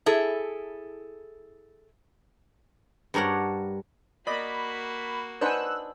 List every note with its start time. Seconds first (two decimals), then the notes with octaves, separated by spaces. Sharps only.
0.06 E4 G#4 A4
3.14 G2 D4 A#4 C#5 F#5
4.27 A#3 F#4 D5 D#5 B5
5.41 D4 D#4 B4 C5 F#5 G#5 E6 F#6